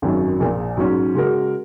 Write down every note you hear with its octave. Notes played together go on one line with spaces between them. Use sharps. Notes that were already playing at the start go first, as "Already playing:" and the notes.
G#1 F#2 F#3 D#4
A#1 A#2 A#3
G#2 F#3 C#4
C#3 G#3 F#4 A#4